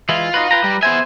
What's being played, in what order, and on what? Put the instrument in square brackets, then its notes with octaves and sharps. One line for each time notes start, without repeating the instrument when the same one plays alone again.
[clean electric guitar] E3 G#3 E4 [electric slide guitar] F4
[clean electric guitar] D#4 F#4 B4
B4 G5 A#5
[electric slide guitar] G3
[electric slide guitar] B3 E5 [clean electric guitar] G#4 C5 G#5